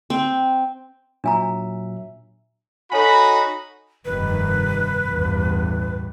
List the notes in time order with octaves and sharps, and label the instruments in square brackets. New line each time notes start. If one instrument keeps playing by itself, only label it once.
[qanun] C4
[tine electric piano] A#2 F#3 E5 [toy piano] D4 G#5 A#5
[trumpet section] D#4 F#4 B5 [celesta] A4 C#5 G#5
[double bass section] F1 G2 D#3 [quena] B4
[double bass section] A1 E2 G2